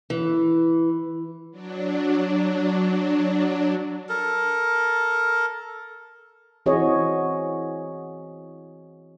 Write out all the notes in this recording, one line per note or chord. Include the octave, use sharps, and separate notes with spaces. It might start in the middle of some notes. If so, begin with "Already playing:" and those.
E3
F#3 D4
A4 A#4
E3 C4 F#4 G#4 C#5 D#5